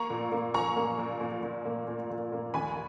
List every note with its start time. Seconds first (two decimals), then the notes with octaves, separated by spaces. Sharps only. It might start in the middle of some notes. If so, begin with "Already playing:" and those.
Already playing: A#3 A#5 C#6
0.10 A#2
0.32 A#3
0.54 A#2 A#5 C#6
0.76 A#3
0.99 A#2
1.21 A#2
1.43 A#2
1.65 A#3
1.88 A#2
2.10 A#2
2.32 A#3
2.54 D#2 G#5 B5